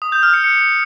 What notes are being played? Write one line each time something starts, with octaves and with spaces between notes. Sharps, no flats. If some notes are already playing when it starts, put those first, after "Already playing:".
D#6
G6
F6
C#7
C#7